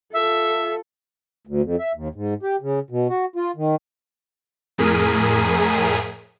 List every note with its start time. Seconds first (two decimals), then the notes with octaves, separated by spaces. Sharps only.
0.13 F4 A4 E5
1.47 D2
1.62 F2
1.79 E5
1.95 D#2
2.14 G#2
2.43 G4
2.61 C#3
2.90 B2
3.09 F#4
3.36 F4
3.56 D#3
4.78 F2 A2 G#4 A#4 B6 D#7